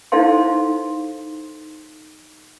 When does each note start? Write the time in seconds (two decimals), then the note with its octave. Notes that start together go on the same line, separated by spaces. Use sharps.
0.12 D#4 E4 A4 C5 F5 C6